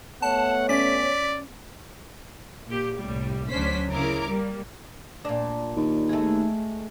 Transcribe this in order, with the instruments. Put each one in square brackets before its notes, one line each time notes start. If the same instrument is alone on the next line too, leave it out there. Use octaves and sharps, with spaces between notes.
[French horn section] A3 B3 C#5 [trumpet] F#5 [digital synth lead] A5
[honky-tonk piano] C#4 [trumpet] D5 [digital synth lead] B6
[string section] A#2 G4
C2 A2 G3
D2 F#3 C#4 D4 C5 B6
C#3 E4 A#4 D6
G3 A#3
[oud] A#2 D4
[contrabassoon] D#2
[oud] G#3 A3